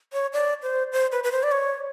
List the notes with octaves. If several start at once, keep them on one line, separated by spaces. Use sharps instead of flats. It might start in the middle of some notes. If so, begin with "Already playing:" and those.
C#5
D5
C5
C5
B4
B4
C5
D5
C#5